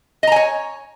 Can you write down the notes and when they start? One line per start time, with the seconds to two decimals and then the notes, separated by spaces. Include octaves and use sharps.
0.23 D#5
0.27 A#5
0.32 G#5
0.36 C#5